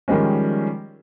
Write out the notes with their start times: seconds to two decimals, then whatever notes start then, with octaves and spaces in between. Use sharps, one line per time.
0.08 D#3 F3 G3 G#3 C#4